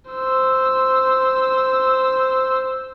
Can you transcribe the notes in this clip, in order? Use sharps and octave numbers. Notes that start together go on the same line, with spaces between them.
C5 E6